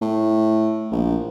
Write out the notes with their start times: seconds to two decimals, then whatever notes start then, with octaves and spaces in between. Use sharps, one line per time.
0.01 A2
0.91 A#1